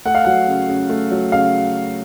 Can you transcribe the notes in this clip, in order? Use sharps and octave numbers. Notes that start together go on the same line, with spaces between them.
A3 F#5
F5
F#3 F#5
C#3
C#3
A3
F#3
C#3 F5